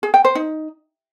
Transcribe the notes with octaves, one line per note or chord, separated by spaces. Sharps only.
G#4
G5
C5
D#4